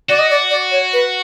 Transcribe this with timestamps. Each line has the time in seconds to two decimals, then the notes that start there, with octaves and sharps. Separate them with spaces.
0.09 F#4 D5
0.19 D#5
0.30 D5
0.50 D5
0.72 C#5
0.93 B4